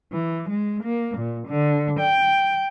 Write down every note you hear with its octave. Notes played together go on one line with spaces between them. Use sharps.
E3
G#3
A#3
A#2
D3
G5